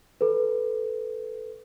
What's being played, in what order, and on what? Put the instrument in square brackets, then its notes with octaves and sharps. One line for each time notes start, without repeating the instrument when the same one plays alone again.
[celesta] A4 B4